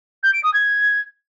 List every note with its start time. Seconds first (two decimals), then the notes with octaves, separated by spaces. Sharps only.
0.23 G6
0.33 D7
0.43 D#6
0.54 G#6